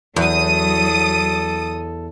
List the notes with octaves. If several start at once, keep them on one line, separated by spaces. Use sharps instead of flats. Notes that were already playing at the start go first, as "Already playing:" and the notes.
E2 F#3 A4 D#6